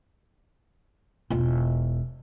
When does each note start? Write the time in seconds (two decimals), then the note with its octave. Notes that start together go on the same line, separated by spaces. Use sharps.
1.30 E1 F4